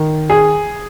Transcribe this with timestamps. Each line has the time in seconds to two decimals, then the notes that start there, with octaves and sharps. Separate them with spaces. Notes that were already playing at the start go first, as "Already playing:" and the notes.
Already playing: D#3
0.30 G#4